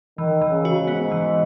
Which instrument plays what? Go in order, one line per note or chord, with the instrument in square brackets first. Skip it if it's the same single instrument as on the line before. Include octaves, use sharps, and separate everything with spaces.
[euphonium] D#3 [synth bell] E3
[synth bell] E3
[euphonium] C#3
[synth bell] F#4
[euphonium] G#2
[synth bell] B3
E3